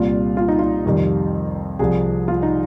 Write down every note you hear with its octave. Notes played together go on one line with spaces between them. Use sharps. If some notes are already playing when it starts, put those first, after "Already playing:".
Already playing: C2 A#2 G3 F4
F4
D#4
F4
F2 C3 D#3 G3
C2 C3 F3 G#4
F4
D#4